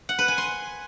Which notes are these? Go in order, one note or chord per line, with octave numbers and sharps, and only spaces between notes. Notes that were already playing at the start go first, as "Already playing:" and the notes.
F#5
B4
G#5
C6